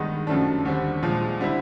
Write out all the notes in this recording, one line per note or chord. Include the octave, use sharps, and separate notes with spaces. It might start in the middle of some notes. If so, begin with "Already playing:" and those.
Already playing: G2 D#3 G#3 B3 D#4
F#2 C#3 F3 A3 D4
D#2 D3 G3 C4
A#2 F3 G#3
D3 G3 C4 E4